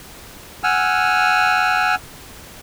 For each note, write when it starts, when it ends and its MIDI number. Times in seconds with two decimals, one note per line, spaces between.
0.64 1.95 78
0.64 1.95 80
0.64 1.95 88
0.64 1.95 89